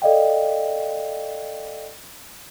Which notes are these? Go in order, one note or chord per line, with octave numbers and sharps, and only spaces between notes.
A4 D5 D#5 F5 G5